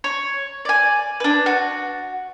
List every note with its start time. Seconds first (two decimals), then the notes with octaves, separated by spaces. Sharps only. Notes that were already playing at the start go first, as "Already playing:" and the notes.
0.04 C#5
0.65 D5 G#5
1.20 D4 B4
1.46 F#4